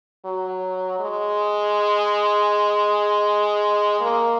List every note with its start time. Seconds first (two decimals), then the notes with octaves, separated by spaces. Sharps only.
0.25 F#3
1.00 G#3
4.01 A#3